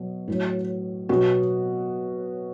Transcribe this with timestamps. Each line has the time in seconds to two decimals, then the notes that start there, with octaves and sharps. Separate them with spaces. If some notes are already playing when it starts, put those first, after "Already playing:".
Already playing: B2 F#3 F#4
0.28 A2 F#3
1.09 B2 F#3 F#4